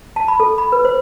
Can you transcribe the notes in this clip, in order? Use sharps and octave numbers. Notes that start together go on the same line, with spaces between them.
A5
B5
A4
B5
B4
C5